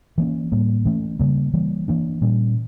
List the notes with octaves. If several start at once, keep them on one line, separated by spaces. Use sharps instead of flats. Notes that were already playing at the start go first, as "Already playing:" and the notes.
E3 A#3 C#4
A2 G3 A#3
E3 A3 C#4
C#3 G3 A#3
E3 G3 A#3
E3 A#3 D4
A#2 G3 C#4